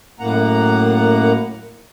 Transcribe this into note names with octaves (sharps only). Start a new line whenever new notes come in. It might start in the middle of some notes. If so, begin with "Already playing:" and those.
F#2 A2 A#3 F#5 A#5